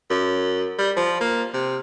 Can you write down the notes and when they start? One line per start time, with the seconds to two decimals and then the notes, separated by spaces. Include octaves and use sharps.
0.10 F#2
0.78 G3
0.96 F3
1.21 A#3
1.54 C3